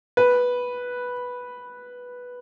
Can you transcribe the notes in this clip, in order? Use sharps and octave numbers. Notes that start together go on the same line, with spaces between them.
B4